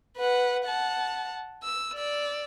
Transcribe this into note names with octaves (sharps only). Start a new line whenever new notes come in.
B4 F#5
F#5 A5
E6
D5 E6